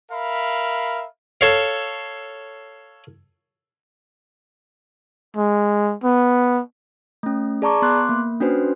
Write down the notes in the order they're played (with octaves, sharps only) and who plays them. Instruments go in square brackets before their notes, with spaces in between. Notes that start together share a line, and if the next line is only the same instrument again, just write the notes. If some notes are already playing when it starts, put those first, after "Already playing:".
[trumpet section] A#4 E5 F5 B5
[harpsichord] A4 C#5 F5
[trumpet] G#3
B3
[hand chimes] A3 C#4
G#4 D5 A5 A#5 C#6 D6
B3 C6 D6 F#6
A#3
C#4 D4 F#4 B4 C5